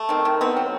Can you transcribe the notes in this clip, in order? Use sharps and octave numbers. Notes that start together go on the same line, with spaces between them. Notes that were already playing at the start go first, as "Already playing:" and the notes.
Already playing: A3
D#3 C4
D#3 C4
B3 C4
F#3